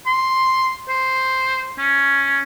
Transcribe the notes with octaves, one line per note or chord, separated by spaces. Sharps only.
C6
C5
C#4